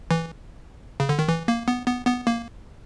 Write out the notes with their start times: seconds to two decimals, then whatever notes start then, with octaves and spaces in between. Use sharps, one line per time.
0.11 E3
1.00 C#3
1.09 D3
1.19 D#3
1.28 E3
1.48 A#3
1.68 B3
1.87 B3
2.07 B3
2.27 A#3